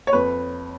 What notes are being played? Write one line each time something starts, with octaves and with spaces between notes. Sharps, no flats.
C#5
F2 B4